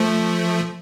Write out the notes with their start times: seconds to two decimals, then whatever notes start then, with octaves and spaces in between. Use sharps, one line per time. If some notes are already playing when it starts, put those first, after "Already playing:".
Already playing: F3 A3